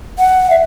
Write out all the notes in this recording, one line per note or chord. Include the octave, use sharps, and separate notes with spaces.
F#5
E5